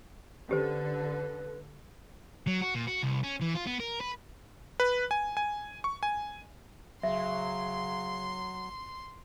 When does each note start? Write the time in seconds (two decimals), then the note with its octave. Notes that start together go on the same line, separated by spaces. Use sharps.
0.49 D3 C#4 G4 A4 B4 C5
2.47 F#3
2.62 F#4
2.75 A#2
2.87 F#4
3.03 C2
3.23 C#4
3.41 E3
3.55 F4
3.67 B3
3.80 A#4
4.01 B4
4.80 B4
5.11 G#5
5.37 G#5
5.84 C#6
6.03 G#5
7.03 C#3 F#3 E5 C6